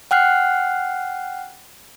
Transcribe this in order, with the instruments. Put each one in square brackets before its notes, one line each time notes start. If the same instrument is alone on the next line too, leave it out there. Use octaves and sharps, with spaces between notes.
[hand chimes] F#5 G5 F6 F#6 C7